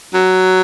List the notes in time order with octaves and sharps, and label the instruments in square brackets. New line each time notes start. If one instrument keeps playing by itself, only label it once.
[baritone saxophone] F#3